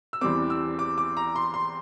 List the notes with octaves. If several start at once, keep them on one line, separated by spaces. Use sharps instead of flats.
E6
E2 E3 G3 C4 D6
E6
D6
D6
A#5
C6
C6